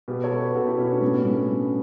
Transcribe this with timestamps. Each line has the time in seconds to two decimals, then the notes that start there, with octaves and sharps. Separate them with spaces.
0.08 B2 G4 B4
0.24 A4 C#5
0.32 B2
0.40 G4 B4
0.55 B2 F#4 A4
0.66 E4 G4
0.78 B2 C#4 E4
0.90 B3 D4
1.01 A2 B3 D4
1.17 C#4
1.25 A2
1.33 B3
1.49 G3